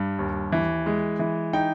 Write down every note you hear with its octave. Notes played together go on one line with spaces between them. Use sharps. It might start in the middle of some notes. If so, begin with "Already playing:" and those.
Already playing: G2 G3
D#2
E3
G#3
E3
D#4 G5